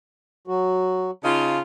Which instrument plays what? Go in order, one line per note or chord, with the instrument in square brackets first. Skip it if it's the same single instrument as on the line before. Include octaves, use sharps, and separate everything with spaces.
[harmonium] F#3 F#4
[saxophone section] C#3 D#4 F4 [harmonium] A5